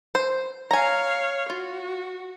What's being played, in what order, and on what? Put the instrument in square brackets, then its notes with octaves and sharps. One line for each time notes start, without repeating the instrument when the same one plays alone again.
[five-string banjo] C5
[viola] C#5 F5 [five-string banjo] G#5 A#5
[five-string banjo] F4 [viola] F#4